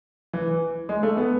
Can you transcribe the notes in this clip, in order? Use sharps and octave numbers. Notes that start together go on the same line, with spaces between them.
E3
G#3
A3
B3